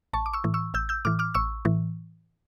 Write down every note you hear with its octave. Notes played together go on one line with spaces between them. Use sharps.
A1 A5 C#6
D6
C#6 E6
A2 E3
C#6 E6
A1 E6 G6
E6 G6
A2 E3 D6 F6
D6 F6
A1 C#6 E6
A2 E3